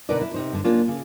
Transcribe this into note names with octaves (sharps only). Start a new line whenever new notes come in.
B2 D3 D#4 A#4 B4 D5
E4
C3 D#4 C5
G2 D3
A#3 C#4 D4 F4
C#3